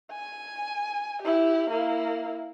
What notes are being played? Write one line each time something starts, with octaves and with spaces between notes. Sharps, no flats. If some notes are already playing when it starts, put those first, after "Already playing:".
G#5
E4 G4
A#3 E4